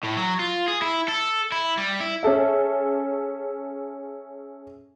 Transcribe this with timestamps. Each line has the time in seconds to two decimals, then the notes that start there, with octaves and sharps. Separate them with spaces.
0.03 A2
0.17 F#3
0.39 F4
0.68 G#4
0.82 E4
1.08 A4
1.52 E4
1.77 G3
2.00 E4
2.23 C#4 G#4 A4 E5